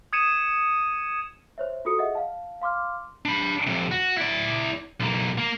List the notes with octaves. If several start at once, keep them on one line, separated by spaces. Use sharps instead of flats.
D#6 G#6 C#7 D#7 E7
C5 C#5 E5
F4 F#4 A4 D#6 C#7
G#4 D#5 E5 F#5
F5 A5
F5 C6 D6 F6
D4 B5
F2 C3
F#4
E4 D5
B1 A#3
A#3